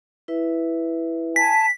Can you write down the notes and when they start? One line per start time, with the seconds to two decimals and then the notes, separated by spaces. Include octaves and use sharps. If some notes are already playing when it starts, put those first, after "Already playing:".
0.28 E4 B4 E5
1.36 G#5 A5 B6